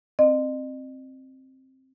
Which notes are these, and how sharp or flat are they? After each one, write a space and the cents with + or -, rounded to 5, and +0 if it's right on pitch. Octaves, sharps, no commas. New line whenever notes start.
C4 +10 D#5 -40